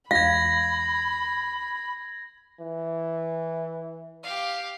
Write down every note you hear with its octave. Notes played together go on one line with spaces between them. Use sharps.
E2 G#3 F5 B5 G#6 A#6
E3
G4 F5